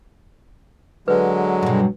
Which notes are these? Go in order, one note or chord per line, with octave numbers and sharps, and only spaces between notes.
D3 F#3 G#3 B4
G2 B2